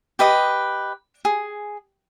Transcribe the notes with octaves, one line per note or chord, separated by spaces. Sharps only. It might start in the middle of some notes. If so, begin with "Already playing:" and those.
G4 B4 D#5 D#6
G#4